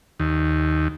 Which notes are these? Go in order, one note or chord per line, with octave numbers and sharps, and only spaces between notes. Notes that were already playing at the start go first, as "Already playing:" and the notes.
D#2